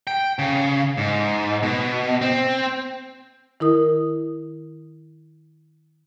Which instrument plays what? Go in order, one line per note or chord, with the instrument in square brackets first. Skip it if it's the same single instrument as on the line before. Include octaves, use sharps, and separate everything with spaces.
[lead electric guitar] G5
C#3
G#2
B2
C4
[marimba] D#3 E4 A#4 D#6